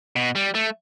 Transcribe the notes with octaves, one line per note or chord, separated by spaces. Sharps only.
B2
G3
A3